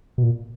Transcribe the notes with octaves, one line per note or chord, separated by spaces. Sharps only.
B2
A#2